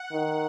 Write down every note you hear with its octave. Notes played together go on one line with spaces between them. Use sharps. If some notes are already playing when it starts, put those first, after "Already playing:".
Already playing: F#5
D#3